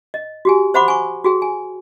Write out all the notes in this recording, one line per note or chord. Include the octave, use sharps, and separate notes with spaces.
D#5
F#4 G4 G#5
C5 E5 F#5 B5 C6 D6
G#5 C#6
F#4 G#4 G5
G#5